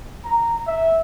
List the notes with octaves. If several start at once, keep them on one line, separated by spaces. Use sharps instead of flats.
A#5
E5